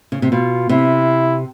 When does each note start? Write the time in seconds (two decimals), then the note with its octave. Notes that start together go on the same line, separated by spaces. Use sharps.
0.12 C#3
0.22 C3
0.32 B2 F4
0.69 C3 E4